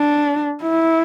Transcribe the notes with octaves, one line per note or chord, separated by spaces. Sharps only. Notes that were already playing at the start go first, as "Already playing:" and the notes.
Already playing: D4
E4